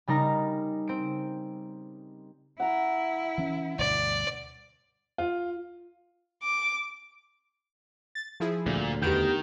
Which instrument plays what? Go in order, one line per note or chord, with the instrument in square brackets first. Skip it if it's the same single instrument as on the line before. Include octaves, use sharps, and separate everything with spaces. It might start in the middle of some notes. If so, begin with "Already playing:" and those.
[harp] C#3 G3 D#4 A#4 A#5
C4 D7
[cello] E4 [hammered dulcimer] F#5 A#5
[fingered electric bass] E3 C#4
[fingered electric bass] D2 G2 B2 [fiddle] D5
[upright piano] F4
[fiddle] D6
[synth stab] A6
F3 E4 G#4
[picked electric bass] D2 [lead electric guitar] A#2
[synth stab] E2 B3 D7 [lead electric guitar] D#3 [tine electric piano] G4 G6